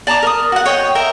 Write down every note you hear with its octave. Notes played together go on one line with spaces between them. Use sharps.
D5 A5 A#5 D6
A#4 D#6
F#4 F#5
C#5 D#5 G5
A#4 E5 G5